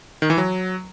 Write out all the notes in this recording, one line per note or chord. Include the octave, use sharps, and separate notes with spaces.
D#3
E3
F#3